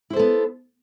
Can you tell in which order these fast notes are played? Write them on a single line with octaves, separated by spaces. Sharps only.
E4 C5 A4 B3